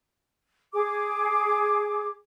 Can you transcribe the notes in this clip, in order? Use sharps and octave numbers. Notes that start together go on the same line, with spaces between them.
G#4 D6